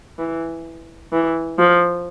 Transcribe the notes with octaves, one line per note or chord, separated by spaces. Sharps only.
E3
E3
F3